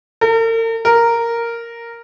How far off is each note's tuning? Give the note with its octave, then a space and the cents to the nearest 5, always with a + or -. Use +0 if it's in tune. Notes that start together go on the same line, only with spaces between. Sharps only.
A#4 -45
A#4 -5